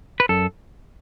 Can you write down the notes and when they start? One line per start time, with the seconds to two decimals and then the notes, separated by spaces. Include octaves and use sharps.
0.20 B4
0.29 F#2 A4